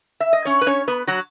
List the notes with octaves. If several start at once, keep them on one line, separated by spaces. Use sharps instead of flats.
E5
D#5
C#4 C#5
B4
C#4 C#5
B3 B4
F#3 F#4